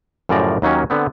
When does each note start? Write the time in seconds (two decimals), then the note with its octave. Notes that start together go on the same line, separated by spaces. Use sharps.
0.29 F#2 A2 C#3 F3 D5 A#5
0.62 D#2 D#3 F#3 A#3 C#4
0.90 D3 B3 C4